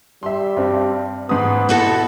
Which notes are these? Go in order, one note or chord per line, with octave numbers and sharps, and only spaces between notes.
G3 E5 C6
G2 C4
G#2 B3 D#6
B2 E4 F#4 A4